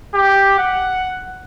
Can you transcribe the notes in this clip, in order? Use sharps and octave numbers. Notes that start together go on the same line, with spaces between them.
G4
F#5